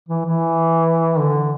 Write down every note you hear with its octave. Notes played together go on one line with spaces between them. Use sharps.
E3
E3
D3